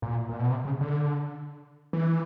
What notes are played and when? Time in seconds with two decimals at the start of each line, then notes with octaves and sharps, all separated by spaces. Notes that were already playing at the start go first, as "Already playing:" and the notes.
0.02 A#2
0.29 A#2
0.39 B2
0.50 C3
0.65 C#3
0.81 D3
1.93 E3